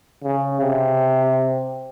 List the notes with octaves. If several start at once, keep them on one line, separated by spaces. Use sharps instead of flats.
C#3
C3